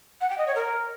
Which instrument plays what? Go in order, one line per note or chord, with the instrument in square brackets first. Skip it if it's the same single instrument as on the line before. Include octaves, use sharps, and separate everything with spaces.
[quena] F#5
G5
D#5
C#5
A#4